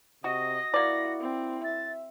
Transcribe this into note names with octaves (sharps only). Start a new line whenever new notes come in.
C3 F#4 D#5 A#6
A#3 E4 F#4 D5
C4
E5 A6